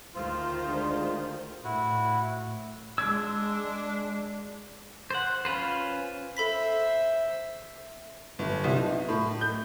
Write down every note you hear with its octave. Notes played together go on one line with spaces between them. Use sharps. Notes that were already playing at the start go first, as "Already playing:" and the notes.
D2 D#3 F4 C5
D3 G#3 D4
A2 E4 F#4
G#3 D4 D6 E6 G#6
C5 F#5
C#4 F4 B4 C5
A4 C5 E5 B5 B6
G1
C2
D#4
A2
G6